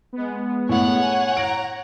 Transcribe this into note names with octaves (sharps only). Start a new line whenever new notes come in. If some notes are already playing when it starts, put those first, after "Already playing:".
G#3 B3
A2 C#5 F#5
G#5
A#5 D7